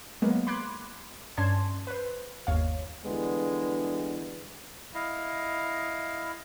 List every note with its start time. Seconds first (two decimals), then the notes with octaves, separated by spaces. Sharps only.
0.22 F#3 G#3 A#3 B3
0.47 B5 C6 D6 F#6 G#6
1.37 G2 C#4 D5 A5 C6 G#6
1.87 B4 C5
2.47 G1 D#2 C#5 F5
3.05 D3 E3 G3 G#3 B3
4.94 E4 D#5 F5